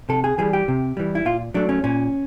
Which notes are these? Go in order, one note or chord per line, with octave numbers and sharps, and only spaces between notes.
C3 A4
G#4
E3 G3 G#4
G4
C3
E3 G3
E4
A#2 F4
F#3 A3 D4
C#4
A#2 C#4